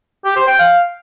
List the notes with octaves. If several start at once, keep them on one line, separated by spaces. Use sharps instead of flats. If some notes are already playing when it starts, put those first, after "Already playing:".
G4
C5
G5
F5